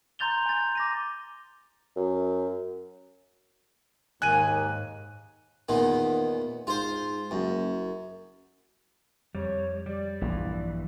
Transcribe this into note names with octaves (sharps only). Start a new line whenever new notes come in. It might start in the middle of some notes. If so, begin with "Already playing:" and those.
A#5 C6 G6 A6 F7 G7
G#5 A6
D6 A#6 D#7
F#2
D#2 G#2 D#3 G#5 F#6 D#7
E2 A#2 D#3 B3
G#2 F4 C5
F#1 F#2
F2 G3 C#5
G3 D5
A#1 G2 E3